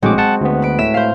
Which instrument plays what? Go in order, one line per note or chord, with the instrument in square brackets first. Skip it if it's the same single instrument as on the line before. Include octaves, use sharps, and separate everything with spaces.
[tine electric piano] A#1 A2 D6 [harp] G#3 C4 F#4
[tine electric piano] F#5 A5
D2 B3
[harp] B4 D7
[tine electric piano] A2 [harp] E5 B6 E7
[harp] C5 F5